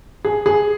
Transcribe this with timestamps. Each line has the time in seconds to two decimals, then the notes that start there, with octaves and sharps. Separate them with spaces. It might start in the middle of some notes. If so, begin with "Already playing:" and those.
0.25 G#4
0.46 G#4